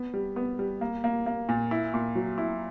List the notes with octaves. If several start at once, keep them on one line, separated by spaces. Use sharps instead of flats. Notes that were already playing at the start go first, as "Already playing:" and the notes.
Already playing: B3
G3
B3
G3
A#3
A#3
A#3
A#2
E4
A#2
F#3
E4